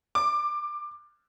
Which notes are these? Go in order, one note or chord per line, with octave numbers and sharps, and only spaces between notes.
D6